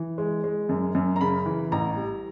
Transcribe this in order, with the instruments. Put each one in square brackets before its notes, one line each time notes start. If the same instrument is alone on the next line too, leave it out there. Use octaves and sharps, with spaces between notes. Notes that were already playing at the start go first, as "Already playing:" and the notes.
Already playing: [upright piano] E3
G#3
G#3
F#2
F#2
A#5
C#3 B5
E3
A1 A#5
G3